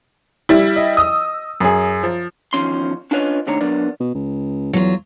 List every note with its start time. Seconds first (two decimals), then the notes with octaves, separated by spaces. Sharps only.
0.49 G3 E4
0.76 D#5
0.97 D#6 E6
1.60 F#2 G#4
2.03 F3
2.53 E2 D#3 F3 C#4 C6
3.11 C#4 D4 F4 B4 C#5 D#5
3.47 C3 D#3 A3 D4 C#5 A#5
3.61 F#3 B3 D4 A#4 D5
4.00 B2
4.14 C#2
4.73 E2 F#3 F4